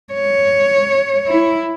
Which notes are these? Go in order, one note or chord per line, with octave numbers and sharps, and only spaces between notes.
C#5
E4